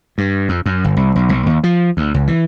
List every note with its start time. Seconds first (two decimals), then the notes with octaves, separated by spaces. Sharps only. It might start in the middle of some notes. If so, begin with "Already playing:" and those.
0.18 G2
0.49 F2
0.66 F#2
0.84 G1
0.97 C2
1.16 B1
1.29 B1
1.46 D#2
1.64 F3
1.97 D2
2.14 C#2
2.27 E3